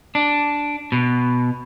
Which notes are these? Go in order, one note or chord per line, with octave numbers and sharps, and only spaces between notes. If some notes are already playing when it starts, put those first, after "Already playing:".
D4
B2